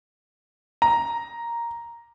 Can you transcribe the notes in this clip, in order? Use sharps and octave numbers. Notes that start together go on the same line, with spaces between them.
A#5